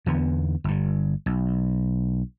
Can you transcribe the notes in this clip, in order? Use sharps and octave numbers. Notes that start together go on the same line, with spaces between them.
E2 D3 B3
G1 G2
B1